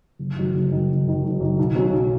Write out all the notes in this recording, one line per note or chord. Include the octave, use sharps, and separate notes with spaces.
F#1
F#2 D#3 F#3
F#1
F#2 D#3 F#3
F#1
F#2 D#3 F#3
F#1
F#2 D#3 F#3
B1
B2 F#3 C#4
B1